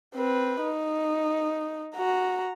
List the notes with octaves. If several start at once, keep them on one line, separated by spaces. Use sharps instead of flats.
C4 B4
D#4
F#4 A#5